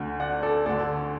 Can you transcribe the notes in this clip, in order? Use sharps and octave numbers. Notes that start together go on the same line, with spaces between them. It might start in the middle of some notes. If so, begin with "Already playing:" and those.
Already playing: D2 D3
D5 F#5
A4 D5
D2 D3 A4 D5